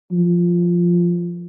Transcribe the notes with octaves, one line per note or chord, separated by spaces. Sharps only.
F3